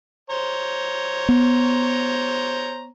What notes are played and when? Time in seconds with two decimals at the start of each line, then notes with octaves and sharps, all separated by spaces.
0.30 C5 C#5 A#5
1.29 B3